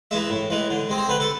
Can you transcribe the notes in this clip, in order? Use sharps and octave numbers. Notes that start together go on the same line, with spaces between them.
E3 G#3 E5
A2
E3 G#3
D3
G#3 C4
C5
D3 B4
A4